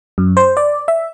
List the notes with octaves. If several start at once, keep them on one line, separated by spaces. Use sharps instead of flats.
F#2
C5
D5
E5